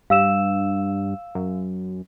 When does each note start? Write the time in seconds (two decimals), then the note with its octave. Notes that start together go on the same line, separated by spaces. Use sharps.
0.10 G2 F5 E6 E7
1.35 F#2